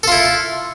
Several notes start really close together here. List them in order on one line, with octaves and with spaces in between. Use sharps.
A4 F4 E4